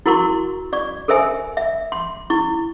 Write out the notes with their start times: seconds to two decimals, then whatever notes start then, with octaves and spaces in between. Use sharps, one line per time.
0.06 E4 F#4 A#4 A#5 C6 C#6
0.73 D5 C#6
1.08 A4 A#4 C5 E5 G#5
1.57 E5
1.92 C6
2.30 E4 C#6